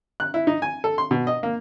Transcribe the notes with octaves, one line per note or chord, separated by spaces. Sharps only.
F#6
E4
D#4
G#5
A4
C6
B2
D#5
A#3